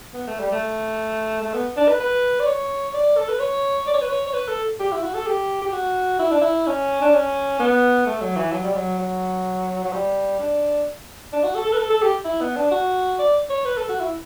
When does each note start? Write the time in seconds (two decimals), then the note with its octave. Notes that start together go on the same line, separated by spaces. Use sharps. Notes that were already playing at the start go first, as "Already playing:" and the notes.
0.14 B3
0.27 A3
0.39 G3
0.52 A3
1.42 A3
1.54 B3
1.77 D4
1.88 B4
2.00 B4
2.40 D5
2.47 C#5
2.94 D5
3.17 A4
3.29 B4
3.40 C#5
3.87 D5
3.94 C#5
4.01 B4
4.09 C#5
4.27 C#5
4.33 B4
4.48 A4
4.80 G4
4.92 E4
5.03 F#4
5.14 A4
5.27 G4
5.62 G4
5.72 F#4
6.19 E4
6.31 D4
6.41 E4
6.67 C#4
7.02 D4
7.13 C#4
7.59 B3
8.06 A3
8.21 F#3
8.37 E3
8.52 F#3
8.64 G3
8.74 F#3
8.99 F#3
9.84 F#3
9.92 G3
10.39 D4
11.33 D4
11.44 F#4
11.55 A4
11.67 A4
11.73 B4
11.78 A4
11.90 A4
12.02 G4
12.25 E4
12.41 B3
12.57 D4
12.72 F#4
13.19 D5
13.50 C#5
13.65 B4
13.77 A4
13.89 F#4
14.00 E4